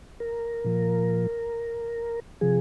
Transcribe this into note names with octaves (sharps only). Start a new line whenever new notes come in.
A#4
A#2 F3
C3 F3 G#4